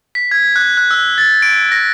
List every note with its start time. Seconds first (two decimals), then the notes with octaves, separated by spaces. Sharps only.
0.15 B6
0.31 G#6
0.56 F#6
0.77 F#6
0.91 E6
1.18 A6
1.42 D7
1.72 A#6